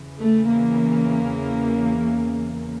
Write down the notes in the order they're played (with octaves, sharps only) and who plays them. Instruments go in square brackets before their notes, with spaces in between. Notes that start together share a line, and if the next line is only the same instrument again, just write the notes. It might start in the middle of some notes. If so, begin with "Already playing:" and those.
Already playing: [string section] E2 C#3 E3
A3
A#3